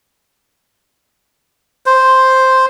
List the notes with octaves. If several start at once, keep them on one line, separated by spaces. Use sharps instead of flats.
C5